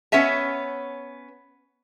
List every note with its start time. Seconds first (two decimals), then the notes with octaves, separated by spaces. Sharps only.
0.12 B3 C#4 C#5 E5 G#5